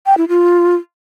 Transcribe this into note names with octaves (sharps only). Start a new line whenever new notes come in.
G5
E4
F4